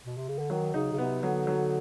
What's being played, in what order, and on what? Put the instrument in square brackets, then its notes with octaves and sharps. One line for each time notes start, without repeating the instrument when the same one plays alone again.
[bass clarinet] B2
C3
C#3
D3
[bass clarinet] D#3 [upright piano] F#3
[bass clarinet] C#3 [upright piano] D#4
[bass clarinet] C#3
[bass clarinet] C3 [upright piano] B3
[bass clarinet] D3 [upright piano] F#3
[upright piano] F#3